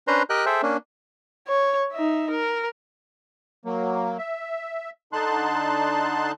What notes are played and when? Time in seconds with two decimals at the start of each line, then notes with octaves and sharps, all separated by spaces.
0.07 C#4 D4 B4 C5 A#5 C6
0.30 G4 A#4 D#5 G5 F#6
0.46 G#4 A4 C5 E5 G5
0.63 A#3 C#4 D4
1.48 C#5
1.93 D#4 E5
2.30 A#4
3.65 F#3 A#3
4.18 E5
5.13 D3 D#4 A5 C6 F#6